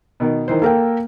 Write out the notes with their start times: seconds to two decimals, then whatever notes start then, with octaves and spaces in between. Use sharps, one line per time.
0.20 B2 D#3
0.48 D#3 E3 C5
0.62 A#3 A4 A#4 G5